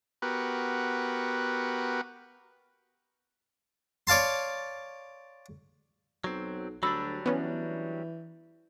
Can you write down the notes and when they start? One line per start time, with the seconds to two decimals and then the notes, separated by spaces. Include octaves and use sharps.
0.22 B3 F#4 G4 A#4 B4
4.07 C#5 D5 F5 A5 C6
6.24 B1 F#3 C4
6.83 D2 F#3 G3 D4 B5 E6
7.26 E3 B3 C#4